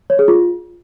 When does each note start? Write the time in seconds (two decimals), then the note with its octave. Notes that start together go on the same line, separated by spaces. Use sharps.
0.10 C#5
0.19 G#4
0.28 F4